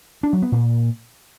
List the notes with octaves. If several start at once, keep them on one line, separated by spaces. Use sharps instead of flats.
D4
F#3
B3
A#2